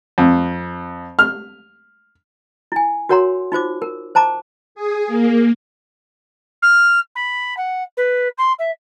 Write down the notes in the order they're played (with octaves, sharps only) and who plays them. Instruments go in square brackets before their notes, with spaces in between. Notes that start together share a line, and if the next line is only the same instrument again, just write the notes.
[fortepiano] F2
F6
[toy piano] E4 G#5
F#4 A#4 C#5 F#5 A#5 C6
D#4 F4 C5 D6
A#4
C5 A5 A#5 D6
[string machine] G#4
A#3
[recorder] F6
B5
F#5
B4
C6
E5